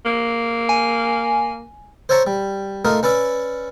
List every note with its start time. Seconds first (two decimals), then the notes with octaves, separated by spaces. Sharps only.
0.05 A#3
0.69 G#5
2.09 C5 C#5 E5 A5 A#5 C#6
2.27 G3
2.85 A3 D#4 F4 A#4
3.03 C#4 B4 D5 E5